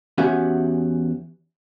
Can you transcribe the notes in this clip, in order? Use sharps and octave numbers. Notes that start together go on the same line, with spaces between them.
E2 C#4 F#4 G4 E5 F#5